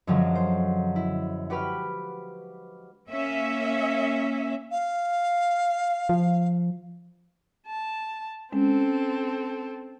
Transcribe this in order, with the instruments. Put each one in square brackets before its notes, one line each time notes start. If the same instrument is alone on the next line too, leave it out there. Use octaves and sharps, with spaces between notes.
[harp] F#2 D3 F3 F#3 G#3
C5
E4
F#4 G4 B4 B5 F6
[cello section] A#3 C#4 E5
[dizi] F5
[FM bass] F3
[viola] A5
[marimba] G#3 C#4 [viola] C4 A4